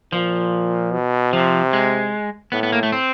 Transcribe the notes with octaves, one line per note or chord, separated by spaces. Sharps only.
A#2 F3
B2
C3 F3
G#3
A2 B3
B3
A#3
A3
C4